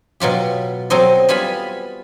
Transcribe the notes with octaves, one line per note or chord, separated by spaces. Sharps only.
B2 F#3 F4 G4
F#3 C4 A4 C5 D#5
G3 B3 F4 F5 G#5 B5